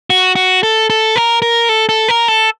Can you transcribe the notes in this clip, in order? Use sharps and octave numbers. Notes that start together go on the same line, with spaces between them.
F#4
F#4
A4
A4
A#4
A#4
A4
A4
A#4
A4